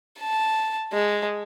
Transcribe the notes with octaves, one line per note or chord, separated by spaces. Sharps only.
A5
G#3